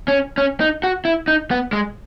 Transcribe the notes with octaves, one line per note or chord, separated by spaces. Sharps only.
C#4
C#4
D#4
F#4
E4
D#4
B3
G#3